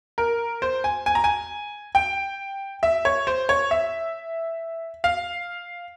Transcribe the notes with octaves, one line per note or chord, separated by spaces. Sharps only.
A#4
C5
G#5
G#5
A#5
G#5
G5
E5
C#5
C5
C#5
E5
F5